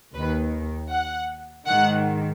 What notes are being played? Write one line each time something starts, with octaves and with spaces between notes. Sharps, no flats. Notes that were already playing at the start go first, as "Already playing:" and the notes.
D#2 D#3 B4
F#5
G#2 D#3 F#5